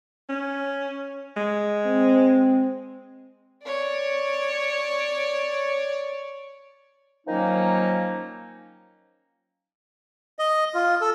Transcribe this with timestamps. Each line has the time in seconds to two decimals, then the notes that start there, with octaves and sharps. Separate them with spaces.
0.29 C#4
1.37 G#3
1.86 C4
3.66 C#5 D5
7.27 D#3 F3 F#3 A#3 C#4 D#4
10.39 D#5
10.74 F4
11.01 A4